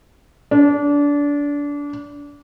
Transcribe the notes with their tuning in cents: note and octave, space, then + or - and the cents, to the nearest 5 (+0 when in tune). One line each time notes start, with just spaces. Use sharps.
D4 -25